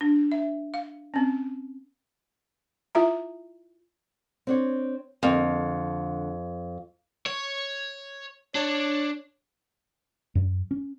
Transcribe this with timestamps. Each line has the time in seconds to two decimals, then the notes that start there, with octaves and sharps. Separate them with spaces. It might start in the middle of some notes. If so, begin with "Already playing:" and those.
0.01 D4
0.32 E5
0.74 F5
1.14 C4 C#4
2.95 E4 F4 E5 A#5
4.47 C4 D4 C#5
5.23 F2 D3 A#3
7.26 C#5
8.55 D4 C#5
10.35 F#2
10.71 C#4